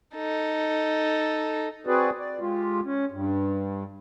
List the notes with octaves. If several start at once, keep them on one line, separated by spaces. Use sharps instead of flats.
D#4 A4
C4 F#4 G#4 B4 D5
D5
G#3 F4 G4
C#4
G2